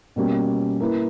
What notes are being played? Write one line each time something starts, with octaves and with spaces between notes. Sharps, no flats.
B2 G3 A#3 C#4 G4
A#3 E4 B4